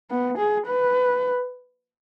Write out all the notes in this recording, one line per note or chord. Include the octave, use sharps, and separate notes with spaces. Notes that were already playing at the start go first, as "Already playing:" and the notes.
B3
G#4
B4